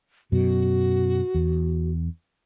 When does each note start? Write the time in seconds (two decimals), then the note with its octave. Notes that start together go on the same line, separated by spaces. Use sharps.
0.32 F#2 B2 F#4
1.34 E2